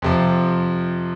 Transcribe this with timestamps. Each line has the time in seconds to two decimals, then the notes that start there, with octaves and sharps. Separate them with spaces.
0.02 F2 C3 F3